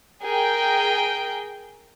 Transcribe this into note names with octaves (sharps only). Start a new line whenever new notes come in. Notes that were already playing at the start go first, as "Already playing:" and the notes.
G#4 A#4 G5